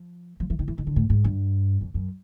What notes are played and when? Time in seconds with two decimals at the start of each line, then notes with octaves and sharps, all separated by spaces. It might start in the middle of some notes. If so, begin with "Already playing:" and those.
Already playing: F3
0.40 F3
0.50 E3
0.59 D#3
0.68 E3
0.78 D#3
0.87 D3
0.96 A2
1.10 G#2
1.24 G2
1.81 F2
1.94 F#2